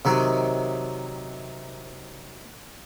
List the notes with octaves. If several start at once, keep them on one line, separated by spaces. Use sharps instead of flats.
C3 D#3 F#3